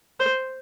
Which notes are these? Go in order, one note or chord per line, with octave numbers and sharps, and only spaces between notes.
C5